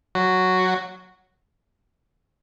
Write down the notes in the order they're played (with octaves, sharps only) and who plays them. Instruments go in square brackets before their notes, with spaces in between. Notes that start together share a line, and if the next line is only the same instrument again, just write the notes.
[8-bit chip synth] F#3 F#4